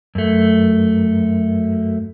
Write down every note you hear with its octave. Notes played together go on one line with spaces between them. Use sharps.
F#2 A3